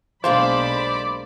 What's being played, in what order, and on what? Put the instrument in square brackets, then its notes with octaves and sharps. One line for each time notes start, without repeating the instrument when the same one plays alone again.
[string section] B1 B5 [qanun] G#3 A#3 D4 [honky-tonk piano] C5 [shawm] D5